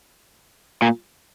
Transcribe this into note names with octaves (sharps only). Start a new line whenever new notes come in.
A#2